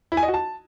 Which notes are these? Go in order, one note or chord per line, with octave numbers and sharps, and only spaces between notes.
E4
G#5
D#5
F#4
A5